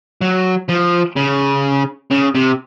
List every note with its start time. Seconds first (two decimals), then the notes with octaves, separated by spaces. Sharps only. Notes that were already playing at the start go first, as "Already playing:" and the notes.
0.21 F#3
0.69 F3
1.17 C#3
2.11 C#3
2.35 C3